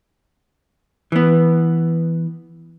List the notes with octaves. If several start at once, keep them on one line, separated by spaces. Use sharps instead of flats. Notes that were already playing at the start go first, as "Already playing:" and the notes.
E3 B3